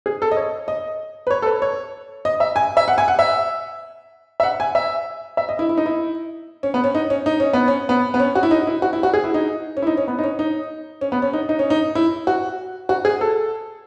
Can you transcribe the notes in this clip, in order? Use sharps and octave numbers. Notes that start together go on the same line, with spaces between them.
G#4
A4
D#5
C#5
D#5
B4
C#5
A4
B4
C#5
D#5
E5
G#5
E5
F#5
G#5
F#5
E5
E5
F#5
G#5
E5
E5
D#5
E4
E4
D#4
E4
C#4
B3
C#4
D#4
C#4
D#4
C#4
B3
C#4
B3
B3
C#4
F#4
E4
D#4
E4
F#4
E4
F#4
G#4
E4
D#4
C#4
E4
D#4
C#4
B3
D#4
C#4
D#4
C#4
B3
C#4
D#4
D#4
C#4
D#4
E4
F#4
F#4
G#4
A4